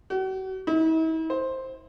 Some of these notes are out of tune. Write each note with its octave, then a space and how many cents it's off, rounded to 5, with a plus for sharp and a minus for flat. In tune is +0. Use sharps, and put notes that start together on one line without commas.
F#4 +40
E4 -45
C5 +5